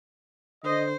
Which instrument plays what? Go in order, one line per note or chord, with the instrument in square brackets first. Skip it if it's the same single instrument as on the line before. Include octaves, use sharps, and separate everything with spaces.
[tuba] D3 [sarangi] C5 [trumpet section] D#5